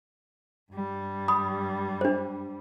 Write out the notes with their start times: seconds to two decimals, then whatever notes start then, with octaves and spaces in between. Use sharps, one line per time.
0.73 G2 G3
1.28 B5 D#6
2.01 D4 C5